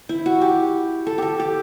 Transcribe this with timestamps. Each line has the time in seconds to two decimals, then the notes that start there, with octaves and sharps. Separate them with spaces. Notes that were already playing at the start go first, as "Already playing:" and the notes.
0.09 E4
0.26 F#4
0.42 G4
1.07 A4
1.18 G4 A4
1.40 G4